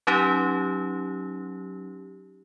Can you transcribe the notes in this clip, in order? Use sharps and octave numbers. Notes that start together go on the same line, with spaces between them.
F#3 C#4 D#4 G4